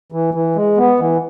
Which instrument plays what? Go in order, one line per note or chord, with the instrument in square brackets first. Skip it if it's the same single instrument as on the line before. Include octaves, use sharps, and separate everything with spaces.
[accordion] E3
E3
G#3
B3
E3